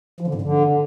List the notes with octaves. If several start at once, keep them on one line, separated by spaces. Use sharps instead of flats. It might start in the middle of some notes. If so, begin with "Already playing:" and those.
F3
D3
G#2
D3